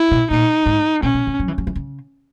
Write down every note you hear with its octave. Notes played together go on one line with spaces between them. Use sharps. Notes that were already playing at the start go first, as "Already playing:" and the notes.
Already playing: E4
B2
A#2 D#4
G#2
B2 C#4
B2
C#3
F#3
E3
F#3
E3
C#3